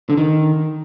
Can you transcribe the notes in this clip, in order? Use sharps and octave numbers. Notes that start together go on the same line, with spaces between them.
D3
D#3